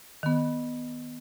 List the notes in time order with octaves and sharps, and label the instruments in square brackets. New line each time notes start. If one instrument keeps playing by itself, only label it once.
[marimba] D#3 B3